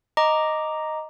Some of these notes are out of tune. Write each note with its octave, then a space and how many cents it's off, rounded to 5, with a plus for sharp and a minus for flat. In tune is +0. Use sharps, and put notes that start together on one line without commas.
D#5 +0 A#5 +0 D6 +0